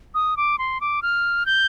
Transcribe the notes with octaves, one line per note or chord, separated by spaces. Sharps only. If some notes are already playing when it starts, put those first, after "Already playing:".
D#6
D6
C6
D6
F6
G6